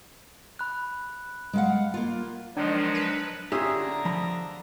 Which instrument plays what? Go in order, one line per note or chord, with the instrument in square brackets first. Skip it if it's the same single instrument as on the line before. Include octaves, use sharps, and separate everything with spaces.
[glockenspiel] B5 F#6
[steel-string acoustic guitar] G#3 F5 F#5
A#3 F4
[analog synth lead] D#3 [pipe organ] F3 F#3 G#3 [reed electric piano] D4
[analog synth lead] B4
[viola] D3 A#5 [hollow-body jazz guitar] C#4 F4 G4 [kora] G#4 E5
[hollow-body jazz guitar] F3 B5